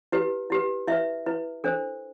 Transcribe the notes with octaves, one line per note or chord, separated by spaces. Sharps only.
E4 G4 B4
E4 G4 B4
E4 B4 E5
E4 B4
D4 A4 C5